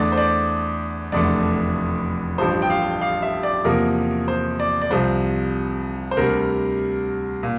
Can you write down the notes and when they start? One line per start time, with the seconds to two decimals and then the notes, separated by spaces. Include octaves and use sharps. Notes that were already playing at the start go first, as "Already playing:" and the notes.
Already playing: E2 D3 A3 D5
0.12 C5
0.17 D5
1.12 F1 E2 D3 A3 D5
2.38 A1 G2 F3 C5
2.62 G5
2.70 F5
3.01 F5
3.22 E5
3.43 D5
3.65 E2 C3 F3 A#3 A#4
4.28 C5
4.60 D5
4.82 D5
4.91 C2 C3 F3 C5
6.11 C5
6.17 D2 C3 G3 A#4
7.43 A#2